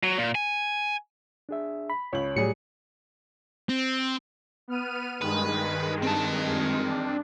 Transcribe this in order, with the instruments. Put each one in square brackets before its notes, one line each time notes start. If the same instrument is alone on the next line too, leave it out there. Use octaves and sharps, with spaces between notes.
[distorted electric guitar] F#3
A#2
G#5
[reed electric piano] D4 G#4 E5
[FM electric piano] B5
[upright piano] C#2 F#7 [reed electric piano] C#5
[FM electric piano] A2 C#7 [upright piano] F#3 G3 G#4
[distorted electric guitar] C4
[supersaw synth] B3 F6 D#7
[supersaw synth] G2 D#3 G#3 [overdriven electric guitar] B4
[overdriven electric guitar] C4 A5
[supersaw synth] D4